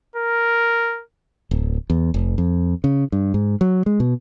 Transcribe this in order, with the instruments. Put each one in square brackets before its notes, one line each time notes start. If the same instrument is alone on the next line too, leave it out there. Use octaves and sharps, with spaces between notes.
[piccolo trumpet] A#4
[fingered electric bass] D1
E2
F1
F2
C#3
G2
G#2
F#3
G#3
B2